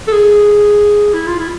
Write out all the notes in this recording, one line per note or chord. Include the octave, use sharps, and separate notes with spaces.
A4
G#4
E4
F4
E4